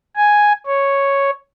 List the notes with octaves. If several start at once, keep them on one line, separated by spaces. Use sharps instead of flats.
G#5
C#5